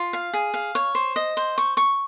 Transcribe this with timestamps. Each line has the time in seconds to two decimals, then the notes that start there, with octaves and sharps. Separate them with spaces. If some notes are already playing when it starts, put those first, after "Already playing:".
Already playing: F4
0.13 F5
0.33 G#4
0.54 F5
0.75 C#5
0.95 C5
1.16 D#5
1.37 C5
1.58 C#6
1.77 C#6